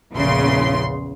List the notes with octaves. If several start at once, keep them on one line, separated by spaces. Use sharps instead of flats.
A#1 E2 C#3 C6